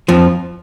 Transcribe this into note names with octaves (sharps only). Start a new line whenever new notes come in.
F2 F3